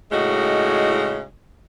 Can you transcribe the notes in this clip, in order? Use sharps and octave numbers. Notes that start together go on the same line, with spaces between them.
A2 C#3 G#3 D#4 F#4